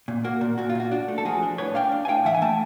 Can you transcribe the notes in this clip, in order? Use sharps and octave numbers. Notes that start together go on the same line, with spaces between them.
A#2
A#3 F#4
A#2
A#2 F#4
F4
A#2 F#4
D4 F#4
A3
A4
F3 F#4 G#4
D4
A2 B4 C#5
D4 F5 G5
D4
G#5
A2 F5 G5
E3 E5 F#5
G#5
A3 G5 A5